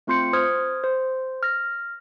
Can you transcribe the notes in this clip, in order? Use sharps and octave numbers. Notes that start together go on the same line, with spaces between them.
A3 C4 F4 C6 G6 C#7
C5 D#6 F6 G#6
C5
F6 A#6